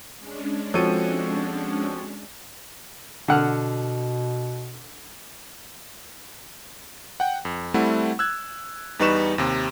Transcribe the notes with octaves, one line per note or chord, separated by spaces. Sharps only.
G#3 C#4 D4
F3 C4 F#4 A4 C#5 D#7
B2 D3 F#5 F6
F#5 G5
F2
G3 A3 C4 E4 F#5
E6 F#6 G#6
E2 G3 D#4 B4 C#6 E7
D#2 C3